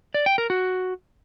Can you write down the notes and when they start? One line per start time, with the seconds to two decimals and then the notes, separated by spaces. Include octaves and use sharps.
0.14 D5
0.26 G5
0.38 A#4
0.50 F#4